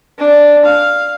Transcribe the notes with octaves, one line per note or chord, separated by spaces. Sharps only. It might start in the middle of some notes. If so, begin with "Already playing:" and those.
D4
F5